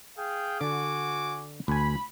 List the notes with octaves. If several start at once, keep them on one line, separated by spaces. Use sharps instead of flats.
G#4 F5 G5
D3 F#4 D5 G#5 D6
D2 G#5 B5